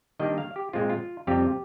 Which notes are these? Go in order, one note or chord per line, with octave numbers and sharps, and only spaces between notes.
D#3 G3 A#3 D4 D#5
F5
G4
A#2 G#3 C4 F4
F4
F2 C3 G3 C4 F4 G4